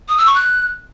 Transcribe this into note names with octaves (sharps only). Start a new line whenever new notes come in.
D#6
E6
C#6
F#6